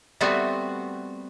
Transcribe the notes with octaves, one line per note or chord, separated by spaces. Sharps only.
G3 A3 B3 C4 F#4 E5